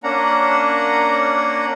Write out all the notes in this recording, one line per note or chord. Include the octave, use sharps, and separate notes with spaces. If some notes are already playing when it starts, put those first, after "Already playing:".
A#3 C#4 D4 F#5 A#5